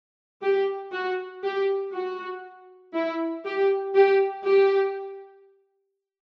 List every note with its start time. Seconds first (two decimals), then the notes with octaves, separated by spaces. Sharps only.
0.42 G4
0.92 F#4
1.43 G4
1.93 F#4
2.94 E4
3.45 G4
3.95 G4
4.45 G4